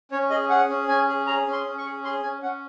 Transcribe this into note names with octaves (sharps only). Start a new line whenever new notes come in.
C#4 C#5
G#4 D#5
G#4 F#5
C#4
C#4 G#5
G#4
G#4 A#5
C#4
C6
C#4
C#6
G#4
G#4 C6
C#4 G#5
C#4 F#5